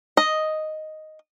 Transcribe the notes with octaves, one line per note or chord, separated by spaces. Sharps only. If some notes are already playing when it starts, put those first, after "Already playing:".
D#5